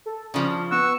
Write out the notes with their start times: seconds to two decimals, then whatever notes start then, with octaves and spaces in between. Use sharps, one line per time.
0.06 A4
0.34 C#3 F3 D4
0.72 B3 F#5 C#6 E6